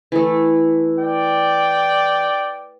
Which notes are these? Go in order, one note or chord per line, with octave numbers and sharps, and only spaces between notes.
E3 A3
D5 G5